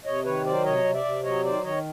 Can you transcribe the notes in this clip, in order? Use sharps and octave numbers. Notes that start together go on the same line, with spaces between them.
C3 C#5 D#5
D#3 B4 C#5
F#3 C5 D5
C3 C#5 D#5
C3
D5 E5
C3
F#3 C#5 D#5
D#3 C5 D5
D#3 C#5 D#5